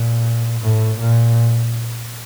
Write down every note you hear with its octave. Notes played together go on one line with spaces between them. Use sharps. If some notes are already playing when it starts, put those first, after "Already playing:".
Already playing: A#2
A2
A#2